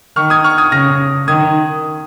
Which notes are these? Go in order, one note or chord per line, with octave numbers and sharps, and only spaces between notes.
D#3 C#6 F6
D#6 G#6
C#6 F6
D#6 G#6
C#3 F6 A#6
D#3 D#6 G#6